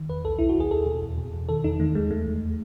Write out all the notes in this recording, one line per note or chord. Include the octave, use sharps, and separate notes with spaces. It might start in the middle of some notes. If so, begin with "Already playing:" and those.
Already playing: D#3
E2 B4
B1 A4
B1 E4
F#4
D#2 G#4
D#2 A4
B2
E2
B2
E2
D#3 A4
E2 D#4
D#3 A3
D#2 G#3
E2 A3
E2